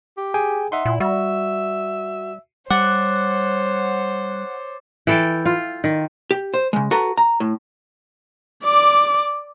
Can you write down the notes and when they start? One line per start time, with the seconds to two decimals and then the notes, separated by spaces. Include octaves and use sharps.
0.18 G4
0.34 G#4 G5 G#5
0.72 D#4 E5 F#5 C6
0.86 A#2 E4
1.00 G3 F#4 E5
2.70 G3 C5 C#5 F#5 D6 A6
5.07 E3 A4 G5
5.46 F4
5.84 D#3
6.31 G4
6.54 C5
6.73 C#3 G#3
6.91 F#4 A4 B4 A#5
7.17 A#5
7.40 A2
8.64 D5 D6